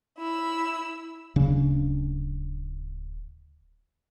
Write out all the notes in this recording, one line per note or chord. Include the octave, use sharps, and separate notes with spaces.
E4 E6
D1 C#3 D4